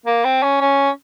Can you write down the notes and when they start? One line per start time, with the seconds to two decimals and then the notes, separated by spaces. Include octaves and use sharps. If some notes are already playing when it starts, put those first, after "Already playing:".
0.06 A#3
0.24 C4
0.43 C#4
0.61 C#4